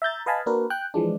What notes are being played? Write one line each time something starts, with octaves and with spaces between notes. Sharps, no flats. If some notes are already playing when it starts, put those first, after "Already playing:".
E5 A#5 G6 A6
B4 D#5 F5 G#5 A5 B5
A#3 D4 F#4 A#4 B4
G5 F#6
E3 F3 G#3 D4